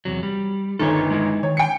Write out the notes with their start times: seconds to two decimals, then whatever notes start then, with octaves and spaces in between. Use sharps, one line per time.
0.05 E2 C3 F#3
0.23 G3
0.79 G1 D2 D#3 A4 C#5
1.10 G#3 D#4 E4
1.43 D#3 C#5
1.57 G5 C#7